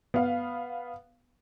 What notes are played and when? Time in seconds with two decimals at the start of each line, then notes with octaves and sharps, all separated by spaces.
0.14 B3 F5